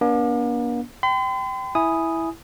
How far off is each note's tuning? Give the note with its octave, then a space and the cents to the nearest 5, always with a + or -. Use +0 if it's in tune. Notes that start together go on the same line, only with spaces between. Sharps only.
A#3 +45 D4 -30
G5 -15 C6 -45
E4 -5 G#5 +0 D#6 +0